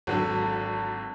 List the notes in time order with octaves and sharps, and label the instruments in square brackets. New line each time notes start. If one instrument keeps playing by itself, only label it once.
[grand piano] G#1 D3 F#3